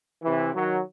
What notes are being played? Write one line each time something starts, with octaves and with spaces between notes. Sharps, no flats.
C3 E3
D#3 F#3